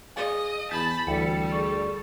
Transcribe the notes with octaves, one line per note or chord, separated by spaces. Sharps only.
G#4 D#5 F5 G#5
E2 G#5 A5 B5 G6 B6
D2 E3 G3 A4 G5 C#7
G#4 D5 C#6